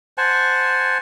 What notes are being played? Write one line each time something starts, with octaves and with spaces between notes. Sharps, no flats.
C5 F#5 G#5 A5